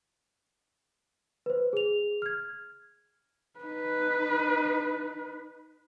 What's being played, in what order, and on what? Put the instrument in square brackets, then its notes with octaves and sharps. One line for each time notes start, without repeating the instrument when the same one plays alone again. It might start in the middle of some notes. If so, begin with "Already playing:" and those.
[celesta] B4 C5
G#4 F7
F6 G#6
[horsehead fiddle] D#4 B4